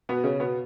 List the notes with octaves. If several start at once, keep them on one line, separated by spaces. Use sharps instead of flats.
B2 B3
C#3 C#4
B2 B3